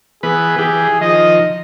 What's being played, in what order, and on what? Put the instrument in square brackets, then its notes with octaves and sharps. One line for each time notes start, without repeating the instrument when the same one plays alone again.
[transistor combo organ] E3 B3 B4 [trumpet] G#4
[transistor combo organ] E3 G4 [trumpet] G#4
[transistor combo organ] D#3 F3 [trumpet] D#5